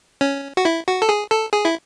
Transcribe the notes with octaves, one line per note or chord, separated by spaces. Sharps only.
C#4
F#4
E4
F#4
A4
G#4
A4
G#4
E4